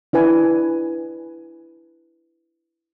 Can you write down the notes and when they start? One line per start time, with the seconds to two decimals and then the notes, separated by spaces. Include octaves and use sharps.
0.13 D4 E4 B4 G#5